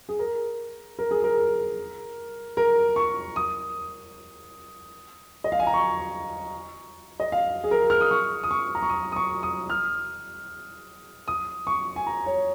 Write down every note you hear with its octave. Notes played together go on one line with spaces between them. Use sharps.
G#4
A#4
A#4
G#4
A#4
A#4
C#6
D#6
D#5
F5
G#5
A#5
C#6
D#5
F5
G#4
A#4
F6
D#6
C#6
D#6
C#6
A#5
C#6
D#6
D#6
C#6
D#6
F6
D#6
C#6
G#5
A#5
C#5